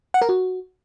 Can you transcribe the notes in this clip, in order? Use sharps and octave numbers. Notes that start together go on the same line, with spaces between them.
F#5
A#4
F#4